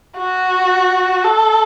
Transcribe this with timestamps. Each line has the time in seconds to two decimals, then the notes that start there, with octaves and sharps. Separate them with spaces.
0.17 F#4
1.24 A4